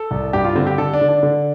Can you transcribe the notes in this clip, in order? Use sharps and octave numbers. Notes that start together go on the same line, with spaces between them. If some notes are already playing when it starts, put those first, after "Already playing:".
Already playing: A4
C2
G2 G4
F4
D3 C4
G4
D3 A4
D4
D3
D4
D3